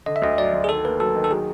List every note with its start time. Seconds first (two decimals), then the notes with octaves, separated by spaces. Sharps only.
0.06 D3 D#5
0.16 E5
0.22 D2 D#5
0.37 F#3 D5
0.53 D2
0.64 G#4
0.69 D#3 A4
0.84 A#3 B4
1.00 F#3 A4
1.16 D#3
1.24 A4
1.31 F#3 G#4